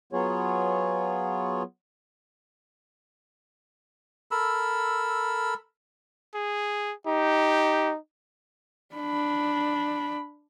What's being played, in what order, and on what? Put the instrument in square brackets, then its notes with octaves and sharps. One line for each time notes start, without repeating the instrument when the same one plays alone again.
[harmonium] F#3 B3 F4 G#4 C#5
[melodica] A4 A#4 B5 E6
[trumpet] G#4
[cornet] D#4 [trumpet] G4
[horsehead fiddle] D4 B5